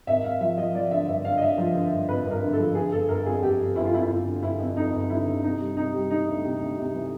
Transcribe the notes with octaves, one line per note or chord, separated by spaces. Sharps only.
G#1 E5
G#1 F5
F3 E5
F3 D#5
F3 D5
D3 E5
G2 E5
D3 F5
D#5
D3 E5
F3
D3
G2
G#1 B4
G2
A#4
D3
A4
F3
D3 G#4
G1 A4
G1 A#4
F2 G#4
G1 G4
G1
G1 E4
F4
F2 E4
E4
G1 F4
D3
G1 E4
F2
F2 D#4
G1
D3 E4
D3
C3 D#4
G3
C3 D#4
G3
E3 D#4
D2
C3
D2
C3
E3